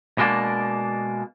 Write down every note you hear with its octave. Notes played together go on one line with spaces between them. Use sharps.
B2 G#3 A#3 D4